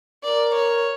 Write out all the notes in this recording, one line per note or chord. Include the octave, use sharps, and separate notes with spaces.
A#4 D5
C#5